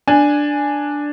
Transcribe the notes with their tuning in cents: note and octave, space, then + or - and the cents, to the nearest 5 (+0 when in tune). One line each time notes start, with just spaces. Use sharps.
D4 +0 G#5 +0